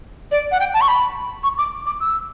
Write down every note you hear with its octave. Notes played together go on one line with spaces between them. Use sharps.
D5
F#5
G5
A5
C#6
B5
C#6
D6
D6
E6